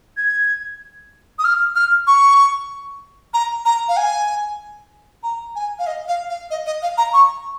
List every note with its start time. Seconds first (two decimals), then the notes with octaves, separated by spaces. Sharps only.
0.17 G#6
1.39 D#6
1.44 F6
1.75 F6
2.07 C#6
3.34 A#5
3.65 A#5
3.88 F5
3.97 G#5
5.23 A#5
5.55 G#5
5.79 F5
5.87 D#5
6.08 F5
6.29 F5
6.50 D#5
6.66 D#5
6.82 F5
6.98 A#5
7.13 C#6